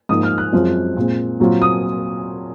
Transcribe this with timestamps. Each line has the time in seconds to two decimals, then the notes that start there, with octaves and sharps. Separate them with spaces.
0.09 G#2 F3 A#3 D#6
0.23 F6
0.38 F#6
0.52 F#2 F3 G#3 C4 F4
0.97 A#2 G#3 C4
1.40 A#2 F#3 C4 F4
1.62 D#6